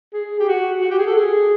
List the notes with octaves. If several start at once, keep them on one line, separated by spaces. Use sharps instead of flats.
G#4
G4
F#4
F#4
G4
G#4
A4
G#4